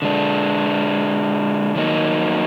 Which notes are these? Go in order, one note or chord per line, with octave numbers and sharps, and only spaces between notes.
D3 G#3 D4
D#3 F#3 A#3 D#4